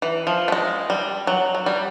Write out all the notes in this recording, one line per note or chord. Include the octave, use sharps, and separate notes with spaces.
E3
F3
A3
G#3
G3
F#3
F#3
G3